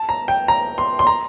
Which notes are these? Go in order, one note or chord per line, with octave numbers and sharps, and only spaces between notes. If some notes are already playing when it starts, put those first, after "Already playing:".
Already playing: A5
A#5
G5
A#5
C6
C6
A#5